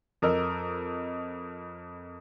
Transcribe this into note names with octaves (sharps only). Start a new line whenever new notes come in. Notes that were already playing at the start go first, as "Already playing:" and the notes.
F2 A#4 D#5 E6